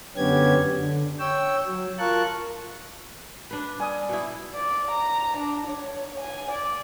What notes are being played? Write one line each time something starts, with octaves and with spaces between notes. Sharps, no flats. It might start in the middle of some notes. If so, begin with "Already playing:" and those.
F#2 D3 B3 C#4 G4 G#6
D3
C#5 G5 E6
F#3
F4 A#4 A5 C#6 F#6
D4 B4
G3 G#5 D#6
B2 E4
D5
A#5
D4
C#5
G#5
D5